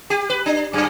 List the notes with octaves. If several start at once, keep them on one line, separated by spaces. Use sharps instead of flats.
G4
B4
D4
F#2